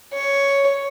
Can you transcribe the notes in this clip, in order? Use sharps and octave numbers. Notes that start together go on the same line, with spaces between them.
C#5